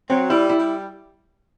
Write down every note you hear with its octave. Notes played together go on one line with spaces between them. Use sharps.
F#3 C4
G3 E4
E4
G3